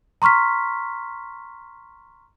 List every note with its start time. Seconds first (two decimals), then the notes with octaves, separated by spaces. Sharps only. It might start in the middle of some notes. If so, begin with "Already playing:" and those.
0.22 A#5 C6 C#6 F6 B6